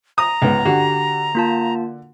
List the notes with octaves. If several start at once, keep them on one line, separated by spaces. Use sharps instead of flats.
A#5 D#6
C#2 G#2 B3
D3 F#4 G4
A#3 F4 A5